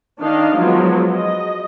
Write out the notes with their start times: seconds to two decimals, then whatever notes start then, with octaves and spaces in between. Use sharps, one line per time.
0.20 D#3 D4 D#4 D#5 F5
0.57 F3 F#3 G#3 B3 F4
1.15 D#5